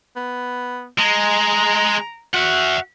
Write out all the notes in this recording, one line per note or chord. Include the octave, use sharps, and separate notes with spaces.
B3
G#3 A#5
F#4 E5 F#5